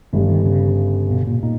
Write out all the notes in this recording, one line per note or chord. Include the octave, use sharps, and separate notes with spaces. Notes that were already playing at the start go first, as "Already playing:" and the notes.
G1 G2 D#3 G3
D#3
C#3
B2
A#2
A#2 D#4